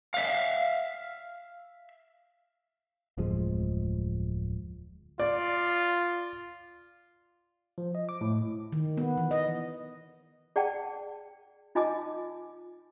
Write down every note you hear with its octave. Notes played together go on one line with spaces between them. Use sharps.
E5 F5
D1 F2 F3 G#3
F4 D5
F3
D#5
D6
A2
D#3
B3
E3
D#5
G#4 D5 F#5 G5 A5
D#4 F4 D#5 G#5 A5 D6